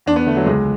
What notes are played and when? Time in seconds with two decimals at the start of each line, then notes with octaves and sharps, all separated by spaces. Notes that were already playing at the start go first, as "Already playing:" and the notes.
0.06 E2 D4
0.16 B3
0.27 D3 A3
0.37 F#3
0.46 C#2 G#3